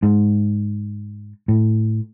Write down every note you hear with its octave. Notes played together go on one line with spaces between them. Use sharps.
G#2
A2